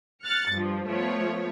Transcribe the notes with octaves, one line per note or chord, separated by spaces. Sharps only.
F6 F#6 A6 C#7
G2 F3
F3 A3 B3 C#5